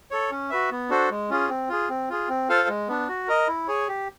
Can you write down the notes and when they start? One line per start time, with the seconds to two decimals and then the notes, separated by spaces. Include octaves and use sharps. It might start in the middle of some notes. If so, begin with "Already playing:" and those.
0.11 A4 C#5
0.31 C#4
0.50 F#4 B4 E5
0.71 B3
0.89 D4 F#4 A4 C5
1.10 G#3
1.30 C#4 F4 G#4
1.49 C4
1.69 F4 G#4
1.89 C4
2.09 F4 G#4
2.29 C4
2.49 F4 A4 C5 F5
2.68 G#3
2.88 B3 D4
3.09 F#4
3.28 A#4 D#5
3.48 E4
3.68 G#4 C#5
3.88 G4